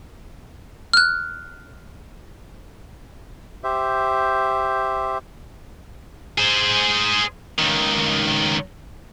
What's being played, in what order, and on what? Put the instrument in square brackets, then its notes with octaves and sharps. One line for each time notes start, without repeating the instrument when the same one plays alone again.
[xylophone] F6 F#6
[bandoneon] G4 C5 E5
[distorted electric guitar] G#4 C5
C#2 D#3